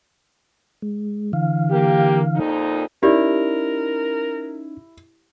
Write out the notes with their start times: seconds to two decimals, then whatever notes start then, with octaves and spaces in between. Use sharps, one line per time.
0.82 G#3
1.33 D3 E3 F5
1.71 A#3 G4
2.35 F2 A#2 D#4
3.03 C#4 D#4 E4 G4 A#4 D5